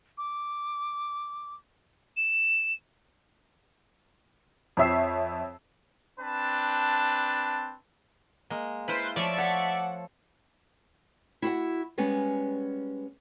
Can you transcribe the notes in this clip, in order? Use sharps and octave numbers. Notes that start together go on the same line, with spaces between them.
D6
E7
F2 C4 C#5 E5 E6 C7
C4 D4 B4 A5
G#3 A#3
E4 F4 B4 C5 C6
F3 A3 C#5 D5 E5 C#6
A4 C#5 F#5
E4 F#4 F5 F#5
G3 G#3 B3 C#4